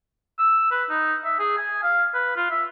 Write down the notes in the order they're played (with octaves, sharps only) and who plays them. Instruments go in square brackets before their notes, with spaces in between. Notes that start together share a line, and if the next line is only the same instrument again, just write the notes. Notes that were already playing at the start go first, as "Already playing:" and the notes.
[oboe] E6
B4
D#4
E5
G#4
G#5
F5
B4
F4
E5